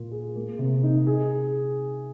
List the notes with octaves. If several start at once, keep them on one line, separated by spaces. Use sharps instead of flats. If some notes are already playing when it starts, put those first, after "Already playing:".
Already playing: A#2 F4
G#4
A#3
C3
D#4
G#4